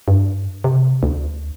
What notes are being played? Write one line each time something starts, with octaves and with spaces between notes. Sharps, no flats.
G2
C3
D2